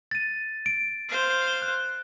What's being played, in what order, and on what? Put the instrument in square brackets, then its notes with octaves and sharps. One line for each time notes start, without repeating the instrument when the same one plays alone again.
[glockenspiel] A6 D#7
D7
[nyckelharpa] C5 F5
[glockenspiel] F#6